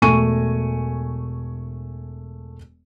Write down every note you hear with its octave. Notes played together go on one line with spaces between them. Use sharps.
E1 A3 G#5 C#6 D#7